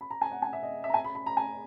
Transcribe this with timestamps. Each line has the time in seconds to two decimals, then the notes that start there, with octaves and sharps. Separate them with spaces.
0.01 B5
0.11 A#5
0.22 G#5
0.31 F#5
0.42 G#5
0.53 E5
0.63 D#5
0.84 E5
0.90 A#5
0.94 G#5
1.05 B5
1.15 B5
1.26 A#5
1.37 G#5